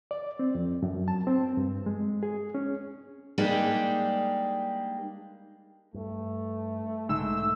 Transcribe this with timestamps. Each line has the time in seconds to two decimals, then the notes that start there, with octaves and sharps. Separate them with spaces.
0.11 D5
0.39 C4
0.55 F2
0.82 F#2
1.08 A5
1.27 C4
1.57 G2
1.86 G#3
2.23 G#4
2.55 C#4
3.38 G3 G#3 A#3 D4 D#4 G4
5.94 G2 A3
7.09 B1 G#2 D3 G#3 A3 E6